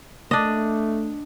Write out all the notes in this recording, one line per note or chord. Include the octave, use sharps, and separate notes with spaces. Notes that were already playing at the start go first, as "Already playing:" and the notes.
A3 D4 D#5